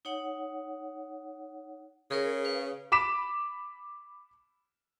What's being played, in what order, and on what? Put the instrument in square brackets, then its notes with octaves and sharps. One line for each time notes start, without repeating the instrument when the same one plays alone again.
[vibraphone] D#4 C#5 F#5
[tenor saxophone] C#3 [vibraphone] G#4 A#4 C#5
[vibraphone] B4 F5
[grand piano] B5 D6 B6 E7